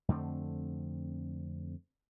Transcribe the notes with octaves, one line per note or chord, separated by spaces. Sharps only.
F2 D3 A3 C4